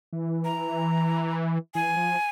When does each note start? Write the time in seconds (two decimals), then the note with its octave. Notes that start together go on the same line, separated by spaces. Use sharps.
0.13 E3
0.45 A#5
1.75 E3 G#5
1.97 F3